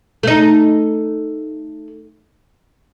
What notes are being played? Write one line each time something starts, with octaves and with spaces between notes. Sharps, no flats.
A3 D#4